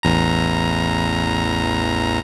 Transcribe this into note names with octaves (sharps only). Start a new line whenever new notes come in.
A1 E2 A#5